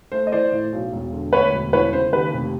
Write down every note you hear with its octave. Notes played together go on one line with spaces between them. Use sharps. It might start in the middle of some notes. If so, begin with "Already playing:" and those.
A3 C5
D#5
E3 C5 D5
A2
B1
E1
D3
D2 B4 C#5
E1
E3 B4 C#5
C#3 C5
D#2 B4
F1